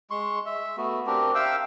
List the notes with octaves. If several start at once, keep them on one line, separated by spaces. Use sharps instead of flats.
G#3 C6 C#6
E5
A3 B3 F#4
C4 D4 G4 A#4
E5 F5 G5 E6